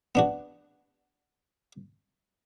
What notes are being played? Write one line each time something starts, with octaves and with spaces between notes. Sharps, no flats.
B3 D4 F#4